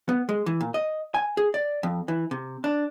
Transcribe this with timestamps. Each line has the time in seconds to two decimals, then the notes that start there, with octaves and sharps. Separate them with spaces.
0.09 B3
0.29 G#3
0.46 E3
0.61 A#2
0.74 D#5
1.14 G#5
1.37 G#4
1.54 D5
1.83 F2
2.08 E3
2.31 C3
2.64 D4